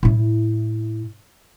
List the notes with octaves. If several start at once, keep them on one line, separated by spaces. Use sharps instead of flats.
A2 E4